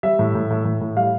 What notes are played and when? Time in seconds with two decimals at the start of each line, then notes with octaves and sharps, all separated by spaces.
0.03 G3 E5
0.19 A2
0.35 A2
0.50 A2
0.65 A2
0.81 A2
0.97 G3 F5